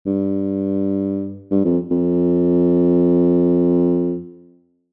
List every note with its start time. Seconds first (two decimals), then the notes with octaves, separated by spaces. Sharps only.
0.06 G2
1.51 G2
1.65 F2
1.91 F2